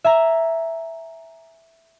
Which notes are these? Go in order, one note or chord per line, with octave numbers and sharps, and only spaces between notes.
E5 G#5 A#5